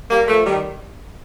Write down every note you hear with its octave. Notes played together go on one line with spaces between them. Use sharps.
G3 A#3
F3 A3
D#3 G3